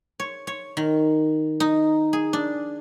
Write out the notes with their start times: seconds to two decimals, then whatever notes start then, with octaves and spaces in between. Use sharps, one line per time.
0.20 C#5
0.47 C#5
0.77 D#3
1.60 D#4
2.13 G#4
2.33 D4